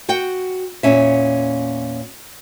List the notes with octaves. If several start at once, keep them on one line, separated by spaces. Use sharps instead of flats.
F#4 F#5 G5
E2 A#2 D3 F3 C#4 E5